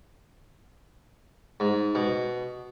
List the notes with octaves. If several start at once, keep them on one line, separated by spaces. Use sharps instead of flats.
G#2
B2